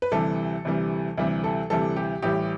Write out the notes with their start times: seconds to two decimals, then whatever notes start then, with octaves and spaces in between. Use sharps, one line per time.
0.02 B4
0.12 D2 C3 E3 G3 A4
0.65 D2 C3 E3 G3
1.18 D2 C3 E3 G3
1.44 A4
1.70 D2 C3 E3 G3 A4
1.96 G4
2.22 A1 A2 E3 G3 G4